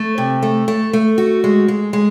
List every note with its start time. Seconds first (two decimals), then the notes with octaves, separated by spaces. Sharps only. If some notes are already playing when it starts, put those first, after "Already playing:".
Already playing: A3
0.18 C3
0.42 A3
0.68 A3
0.93 A3
1.18 F#4
1.44 G#3
1.68 G#3
1.93 G#3